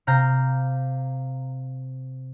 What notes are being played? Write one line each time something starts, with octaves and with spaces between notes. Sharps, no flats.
C3 F5 A#5 G6 A#6